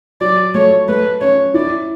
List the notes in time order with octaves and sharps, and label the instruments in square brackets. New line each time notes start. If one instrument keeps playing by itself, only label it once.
[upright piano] F#3 [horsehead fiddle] D5
[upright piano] A3 [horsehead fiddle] C#5
[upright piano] A3 [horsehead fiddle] B4
[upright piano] C#4 [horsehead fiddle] C#5
[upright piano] E4 [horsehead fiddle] D5